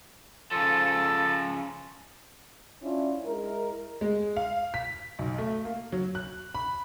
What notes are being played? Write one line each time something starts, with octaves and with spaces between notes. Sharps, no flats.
C#3 F3 A4
A4
C#4 D4 E4 F4
G#3 E4 A#4
G#3
F5
B6
B1
A3
A#3
F#3
F#6
B5